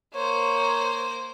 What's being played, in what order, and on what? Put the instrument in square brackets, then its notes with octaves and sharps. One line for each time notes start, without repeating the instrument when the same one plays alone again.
[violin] A#3 C5 [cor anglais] C#5